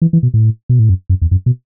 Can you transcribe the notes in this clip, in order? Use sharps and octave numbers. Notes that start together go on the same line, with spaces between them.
E3
E3
B2
A2
B2
A2
F#2
F#2
E2
F#2
B2